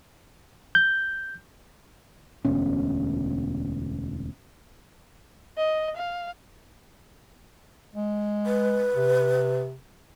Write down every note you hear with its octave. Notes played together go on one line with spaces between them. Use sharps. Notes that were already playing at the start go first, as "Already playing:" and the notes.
G6
E1 D2 B2 C#4
D#5
F5
G#3
B4
C3